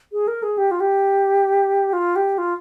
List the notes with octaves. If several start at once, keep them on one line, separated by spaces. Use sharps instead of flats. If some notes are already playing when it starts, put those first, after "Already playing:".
G#4
A#4
G#4
G4
F4
G4
F4
G4
F4